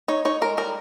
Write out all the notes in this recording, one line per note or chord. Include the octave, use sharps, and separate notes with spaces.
D#4 C#5
D#4 C#5
G#3 A#4
G3 A#4